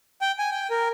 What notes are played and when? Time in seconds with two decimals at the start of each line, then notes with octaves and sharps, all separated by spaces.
0.21 G5
0.39 G#5
0.51 G5
0.70 A#4